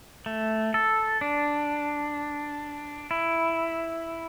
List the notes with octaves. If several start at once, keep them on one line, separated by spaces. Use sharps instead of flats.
A3
A4
D4
E4